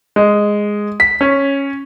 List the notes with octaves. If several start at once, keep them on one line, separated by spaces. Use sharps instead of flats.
G#3
B6
C#4